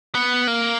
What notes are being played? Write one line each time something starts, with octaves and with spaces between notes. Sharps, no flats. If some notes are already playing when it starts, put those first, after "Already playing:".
B3
A#3